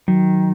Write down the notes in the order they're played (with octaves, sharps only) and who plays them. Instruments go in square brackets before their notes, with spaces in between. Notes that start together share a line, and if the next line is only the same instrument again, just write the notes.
[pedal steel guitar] D#3 [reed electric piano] F#3